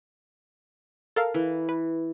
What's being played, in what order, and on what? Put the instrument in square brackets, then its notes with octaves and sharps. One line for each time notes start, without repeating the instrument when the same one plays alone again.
[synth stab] A4 A#4 F5
[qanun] E3
[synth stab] B4